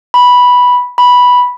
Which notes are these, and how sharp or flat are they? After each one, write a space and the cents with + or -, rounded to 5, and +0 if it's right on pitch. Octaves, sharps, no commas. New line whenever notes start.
B5 -5
B5 -5